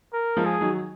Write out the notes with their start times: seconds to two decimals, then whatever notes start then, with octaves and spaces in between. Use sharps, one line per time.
0.13 A#4
0.37 F3 G#3
0.45 G#4
0.61 D#3 F#3